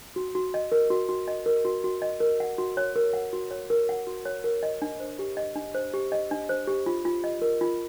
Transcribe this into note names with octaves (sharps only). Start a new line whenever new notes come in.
F#4
F#4
D#5
A#4
F#4
F#4
D#5
A#4
F#4
F#4
D#5
A#4
F#5
F#4
C#5
A#4
F#5
F#4
C#5
A#4
F#5
F#4
C#5
A#4
D#5
D4
C5
G4
D#5
D4
C5
G4
D#5
D4
C5
G4
F4
F4
D#5
A#4
F4